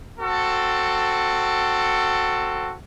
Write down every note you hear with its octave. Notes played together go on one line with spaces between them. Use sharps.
C4 F#4 A4